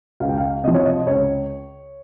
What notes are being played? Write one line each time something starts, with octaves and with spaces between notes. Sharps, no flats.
C#2 F5
G5
F5
C3 F3 D#5
C#5
D#5
C#2 C#5